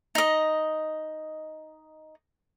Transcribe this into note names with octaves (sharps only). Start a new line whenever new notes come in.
D#4 D#5